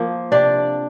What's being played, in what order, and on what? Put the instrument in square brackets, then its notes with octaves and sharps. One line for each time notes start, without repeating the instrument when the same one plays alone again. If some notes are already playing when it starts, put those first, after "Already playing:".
Already playing: [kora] F3 A#3
C3 D4 D5